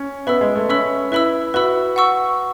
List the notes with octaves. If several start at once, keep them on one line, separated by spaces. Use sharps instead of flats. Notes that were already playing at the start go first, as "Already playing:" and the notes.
Already playing: C#4
B3 B4 E5 B5 E6
G#3
A3
C#4 B4 E5 B5 E6
E4 B4 E5 B5 E6
F#4 B4 E5 B5 E6
F#5 C#6 E6